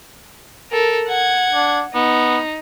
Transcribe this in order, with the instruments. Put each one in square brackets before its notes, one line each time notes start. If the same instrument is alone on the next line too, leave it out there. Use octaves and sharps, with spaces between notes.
[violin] A4 A#4
F#5 G#6
[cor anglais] D4
[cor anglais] B3 [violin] D#4